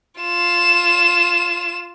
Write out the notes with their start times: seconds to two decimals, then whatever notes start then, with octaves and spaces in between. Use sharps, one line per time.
0.20 F4 E7